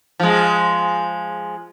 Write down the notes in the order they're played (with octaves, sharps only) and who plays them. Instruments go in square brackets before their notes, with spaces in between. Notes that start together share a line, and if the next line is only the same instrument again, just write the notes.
[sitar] F3 G#3